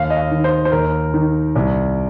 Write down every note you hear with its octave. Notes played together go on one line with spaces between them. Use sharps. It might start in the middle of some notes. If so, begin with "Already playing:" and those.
Already playing: D#2 F5
D#5
F5
D#3
C5
C5
D#2 A#4
D#3
C2